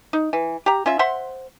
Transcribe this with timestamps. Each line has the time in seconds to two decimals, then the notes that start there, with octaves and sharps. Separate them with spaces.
0.13 D#4
0.33 E3
0.66 G4 A#5
0.86 C#4 F4 E5
0.99 C5 E5 F#5 C6